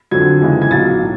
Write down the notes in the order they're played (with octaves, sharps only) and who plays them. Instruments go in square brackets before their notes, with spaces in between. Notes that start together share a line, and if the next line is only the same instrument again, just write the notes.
[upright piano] F2 D3 F#3 G#6
F2 C#3 E3 G#3
G#6
B1 A#2 F#3 A#3 A6
A2